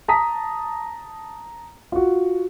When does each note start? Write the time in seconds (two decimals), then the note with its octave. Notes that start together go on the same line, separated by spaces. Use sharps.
0.08 A5 A#5 D#6 B6
1.92 F4 F#4